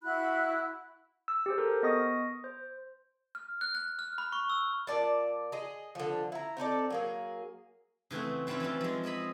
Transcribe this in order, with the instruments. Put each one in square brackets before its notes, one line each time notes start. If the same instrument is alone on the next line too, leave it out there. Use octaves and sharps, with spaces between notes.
[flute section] E4 F#4 B5 F#6
[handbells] E6
G4 G#4 C5
A4 A#4 C5
B3 D#5 C#6 D#6 A#6
C5
[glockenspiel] F6
F#6
F#6
F6
B5
C#6
E6
[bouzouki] A#2 G#3 D5 A5
G#4 D#5
D3 F3
E4 A#5
C4 D#4 A4 D5
F#3 A#3 G#4
[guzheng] C#3 E3 A3 C4 F#4
G3 C4 C#4 E4 F4
E3 F3 G3 E4
F3 G#3
C4 G#4 D#5 B5